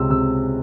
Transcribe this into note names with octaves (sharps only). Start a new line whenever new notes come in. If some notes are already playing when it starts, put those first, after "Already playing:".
Already playing: C#2 C3 C6 E6
C3 E6